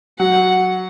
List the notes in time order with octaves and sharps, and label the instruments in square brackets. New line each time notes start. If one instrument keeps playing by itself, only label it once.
[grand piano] F#3 [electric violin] F#5